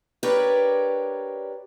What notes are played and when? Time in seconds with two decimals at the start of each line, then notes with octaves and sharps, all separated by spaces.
0.23 D4 G4 A#4 B4 C#5 D5